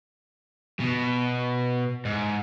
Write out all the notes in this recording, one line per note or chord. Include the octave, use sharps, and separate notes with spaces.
B2
G#2